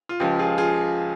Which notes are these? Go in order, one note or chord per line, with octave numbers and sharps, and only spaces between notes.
F4
C#2 C#3 F3 G4
F4 G#4
F4 G#4